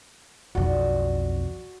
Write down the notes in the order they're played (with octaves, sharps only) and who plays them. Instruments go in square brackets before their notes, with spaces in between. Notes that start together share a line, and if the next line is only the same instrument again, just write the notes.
[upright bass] B1 F2 [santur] F#4 D5